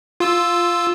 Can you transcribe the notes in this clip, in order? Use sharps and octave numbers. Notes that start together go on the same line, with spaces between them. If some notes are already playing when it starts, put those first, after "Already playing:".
F4 E6